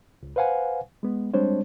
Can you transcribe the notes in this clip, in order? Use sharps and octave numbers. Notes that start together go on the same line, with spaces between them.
C#2
B4 C5 F5 F#5 G#5
G#3 B3
G3 G#3 C4 D4 C5 C#5